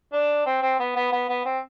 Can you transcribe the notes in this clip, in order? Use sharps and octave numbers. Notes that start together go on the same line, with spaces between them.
D4
C4
C4
B3
B3
B3
B3
C4